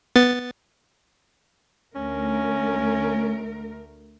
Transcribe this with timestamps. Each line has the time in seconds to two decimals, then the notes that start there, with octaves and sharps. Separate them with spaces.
0.16 B3 A6
1.95 D2 A3 C#4 A#4